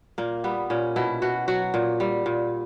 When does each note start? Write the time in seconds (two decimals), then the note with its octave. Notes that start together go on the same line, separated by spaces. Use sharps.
0.18 A#2 A#3
0.44 G3 B3
0.70 A#2 C#4
0.96 B2 E4
1.22 B2 F#4
1.48 F#3 F#4
1.74 A#2
2.00 G3
2.26 A#2